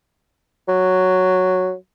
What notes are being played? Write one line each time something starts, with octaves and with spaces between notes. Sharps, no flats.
F#3